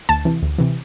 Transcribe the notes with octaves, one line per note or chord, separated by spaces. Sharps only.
D2 A5
C3 E3
D2
C3 E3